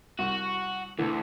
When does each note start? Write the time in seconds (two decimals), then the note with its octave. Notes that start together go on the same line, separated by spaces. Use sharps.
0.19 C2 F#4
0.98 D2 D3 E3